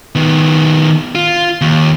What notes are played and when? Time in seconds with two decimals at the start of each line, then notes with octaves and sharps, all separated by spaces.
0.15 D#3 B3
1.15 F4
1.61 D#2